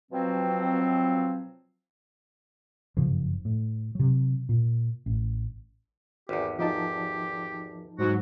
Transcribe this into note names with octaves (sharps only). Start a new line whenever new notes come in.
B2 F3 F#3 C4
F#1 G2 C#3 F3
A2
C3 F#3
A#2
A1
G#1 E2 G4
F3 D#4 G4 A5
G#2 F#3 F#4